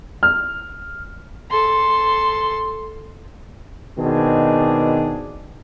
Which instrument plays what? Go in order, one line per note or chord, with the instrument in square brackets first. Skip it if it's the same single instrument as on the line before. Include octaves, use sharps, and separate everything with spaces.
[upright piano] F6
[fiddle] A4 C6
[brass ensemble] B2 D#3 C4 D4 G#4